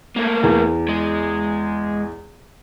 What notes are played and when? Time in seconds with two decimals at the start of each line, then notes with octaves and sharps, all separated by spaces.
0.16 A3 A#3
0.43 E2
0.89 G#3